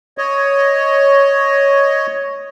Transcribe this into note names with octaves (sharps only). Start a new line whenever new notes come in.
C#5 D#5